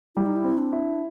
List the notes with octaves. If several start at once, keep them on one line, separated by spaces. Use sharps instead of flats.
G3 E4
D#4
E4
C4
D4
E4